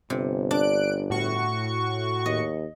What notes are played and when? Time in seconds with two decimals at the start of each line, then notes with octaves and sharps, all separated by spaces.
0.10 G1 C3
0.51 D4 F#6 D7
1.10 A2 F#4 C#6
2.26 D#2 D#5